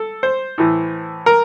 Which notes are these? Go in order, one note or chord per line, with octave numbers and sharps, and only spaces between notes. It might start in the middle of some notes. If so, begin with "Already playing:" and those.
Already playing: A4
C5
A2 E3
A#4